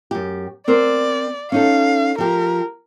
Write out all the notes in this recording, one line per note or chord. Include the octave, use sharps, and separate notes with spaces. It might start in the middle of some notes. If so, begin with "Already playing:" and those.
F#2 G4
C4 A#4 C5 D5
C#4 D#4 A4 F5
F3 G4 A#4